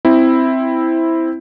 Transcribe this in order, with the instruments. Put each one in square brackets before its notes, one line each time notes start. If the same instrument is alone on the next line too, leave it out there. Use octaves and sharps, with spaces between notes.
[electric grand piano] C4 E4